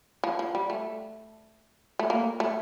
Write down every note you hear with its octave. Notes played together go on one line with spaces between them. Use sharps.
F3
F3
G3
A3
A3
A#3
A3